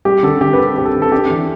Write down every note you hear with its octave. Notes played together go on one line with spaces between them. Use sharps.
G3 G4
D3 A4
D3 G4
B4
C4 A4
C4 G4
A4
D3
A4
D4 G4
E3